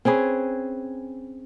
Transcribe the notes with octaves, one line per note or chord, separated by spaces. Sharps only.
C4 C#4 G#4 B4